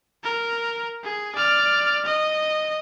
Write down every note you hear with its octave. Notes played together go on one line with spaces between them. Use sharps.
A#4
G#4
D5 F6
D#5